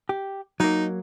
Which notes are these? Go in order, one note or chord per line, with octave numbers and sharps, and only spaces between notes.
G4
F#3 A#3 D#4